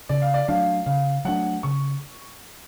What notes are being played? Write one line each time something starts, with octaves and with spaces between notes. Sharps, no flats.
C#3 D5
F5
D5
F#3 A3 D4 F5
C#3 F5
F#3 A3 D4 F#5
C#3 C#6